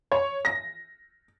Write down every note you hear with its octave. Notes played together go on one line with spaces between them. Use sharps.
C#5
A#6